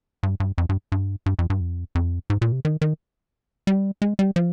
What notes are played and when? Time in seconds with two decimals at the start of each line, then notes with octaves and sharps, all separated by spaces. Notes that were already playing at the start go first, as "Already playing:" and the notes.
0.23 G2
0.40 G2
0.58 F2
0.69 G2
0.92 G2
1.26 G2
1.39 F2
1.50 G2
1.60 F2
1.95 F2
2.30 G#2
2.42 A#2
2.52 C3
2.65 D#3
2.81 D#3
3.67 G3
4.02 G#3
4.19 G3
4.36 F3